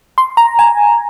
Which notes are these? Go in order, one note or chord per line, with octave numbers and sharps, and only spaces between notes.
C6
A#5
G#5